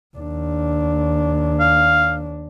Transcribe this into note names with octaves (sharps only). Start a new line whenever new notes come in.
D#2 D4
F5